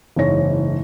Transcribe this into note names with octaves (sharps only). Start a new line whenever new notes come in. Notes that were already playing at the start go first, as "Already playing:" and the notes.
F#1 G#2 E3 C#5 A#6